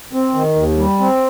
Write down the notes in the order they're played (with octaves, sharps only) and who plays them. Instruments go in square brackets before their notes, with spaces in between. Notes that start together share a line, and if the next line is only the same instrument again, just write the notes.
[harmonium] C4
D#3
D#2
G3
C4